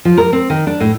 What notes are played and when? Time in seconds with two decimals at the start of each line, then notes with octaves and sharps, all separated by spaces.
0.05 F3
0.18 A#4
0.33 C4
0.50 D#3
0.67 D4
0.80 A2